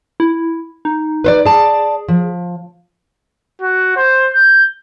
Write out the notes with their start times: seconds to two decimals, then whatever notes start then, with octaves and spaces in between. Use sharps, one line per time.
0.20 E4
0.85 D#4
1.24 B4 C5 D5
1.45 G#4 D5 A5
2.08 F3
3.62 F#4
3.97 C5
4.34 G6